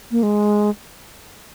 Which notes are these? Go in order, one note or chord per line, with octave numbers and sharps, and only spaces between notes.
A#3
G#3